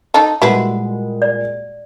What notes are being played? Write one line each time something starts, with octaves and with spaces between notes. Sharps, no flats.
D#4 A4
A#2 G3 G#3 E4 F#4 B4 F#5
D5